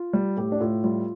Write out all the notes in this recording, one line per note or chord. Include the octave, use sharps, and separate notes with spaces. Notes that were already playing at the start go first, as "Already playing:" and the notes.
Already playing: F4
G3
A2 G4
D4
A2 F4
G3 F4